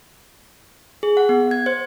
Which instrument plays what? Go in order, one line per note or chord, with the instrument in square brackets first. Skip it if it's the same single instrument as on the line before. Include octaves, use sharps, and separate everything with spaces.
[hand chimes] G#4
F#5
B3
G#6
C5